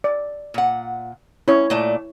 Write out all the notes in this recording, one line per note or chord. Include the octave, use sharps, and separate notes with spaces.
D5
A#2 F#5
C#4 E4 C#5
A#2 A3 D5